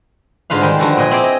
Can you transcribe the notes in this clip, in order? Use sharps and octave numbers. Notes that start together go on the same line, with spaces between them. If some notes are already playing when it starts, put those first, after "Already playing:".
G#2 D3 F4 B4 F5
D#3 G3 G#3
D3 F3 G3 F#4 A4 A5
A#2 D#5 G#5
C4 E4 G#4 D5
D#5